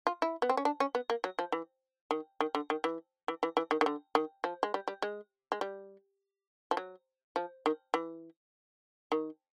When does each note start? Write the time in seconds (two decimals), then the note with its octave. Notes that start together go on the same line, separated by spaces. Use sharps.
0.07 F4
0.22 E4
0.42 B3
0.49 C4
0.57 C#4
0.65 D4
0.80 C#4
0.95 B3
1.10 A#3
1.24 F#3
1.39 F3
1.52 E3
2.11 D#3
2.41 D#3
2.55 D3
2.70 D#3
2.84 E3
3.28 E3
3.43 E3
3.57 E3
3.71 D#3
3.81 D#3
3.86 D3
4.15 D#3
4.44 F3
4.63 G#3
4.74 G3
4.88 G3
5.02 G#3
5.52 G#3
5.61 G3
6.71 F3
6.77 F#3
7.36 F3
7.66 D#3
7.94 E3
9.12 D#3